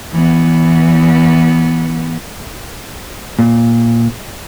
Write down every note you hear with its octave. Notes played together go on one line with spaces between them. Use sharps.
E3 B3
A#2